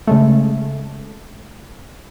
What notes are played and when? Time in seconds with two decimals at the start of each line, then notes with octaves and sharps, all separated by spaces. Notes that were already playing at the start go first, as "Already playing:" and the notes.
0.07 C#3 G#3 A3